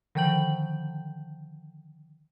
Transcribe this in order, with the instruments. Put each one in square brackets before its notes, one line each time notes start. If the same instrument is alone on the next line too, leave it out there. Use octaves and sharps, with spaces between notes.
[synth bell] D3 D#3 F3 G5 G6 F#7